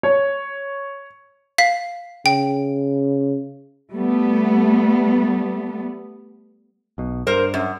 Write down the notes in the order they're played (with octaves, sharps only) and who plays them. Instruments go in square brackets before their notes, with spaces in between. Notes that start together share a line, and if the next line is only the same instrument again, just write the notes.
[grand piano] C#5
[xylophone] F5 B6
[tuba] C#3 [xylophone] G5
[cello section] G3 A3 B3
[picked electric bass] B1 B2
[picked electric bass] G2 [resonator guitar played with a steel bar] A#4 C5
[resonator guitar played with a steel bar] F#2